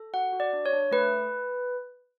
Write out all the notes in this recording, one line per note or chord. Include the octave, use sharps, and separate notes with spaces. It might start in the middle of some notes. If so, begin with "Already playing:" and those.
Already playing: A4
F#4 F#5
F#4
D5
D4
C#5
D4
A3 B4